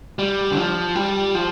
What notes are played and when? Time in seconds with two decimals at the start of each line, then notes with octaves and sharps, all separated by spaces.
0.19 G3
0.52 D3
0.57 F3
0.95 G3
1.35 F3